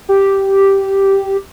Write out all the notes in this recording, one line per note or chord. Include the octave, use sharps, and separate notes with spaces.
G4